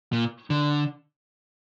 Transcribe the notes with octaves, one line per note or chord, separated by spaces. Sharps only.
A#2
D3